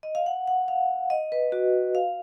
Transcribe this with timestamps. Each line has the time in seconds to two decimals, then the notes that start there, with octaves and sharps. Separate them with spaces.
0.03 D#5
0.15 F5
0.26 F#5
0.47 F#5
0.68 F5
1.10 D#5
1.32 B4
1.52 F#4
1.95 F5